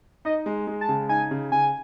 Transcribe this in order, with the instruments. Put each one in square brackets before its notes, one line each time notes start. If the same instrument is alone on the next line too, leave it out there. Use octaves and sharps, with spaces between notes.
[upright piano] D#4 [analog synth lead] D#5
[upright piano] G#3
G#3
[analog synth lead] A5
[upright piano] C#3
[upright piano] D#4 [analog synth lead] G#5
[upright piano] C#3
[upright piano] C#3 [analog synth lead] G#5